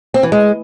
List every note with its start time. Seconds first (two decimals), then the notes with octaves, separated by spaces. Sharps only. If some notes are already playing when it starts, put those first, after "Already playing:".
0.14 C4
0.23 E3
0.32 G#3